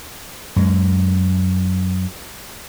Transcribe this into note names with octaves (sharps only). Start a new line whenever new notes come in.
F#2 G#3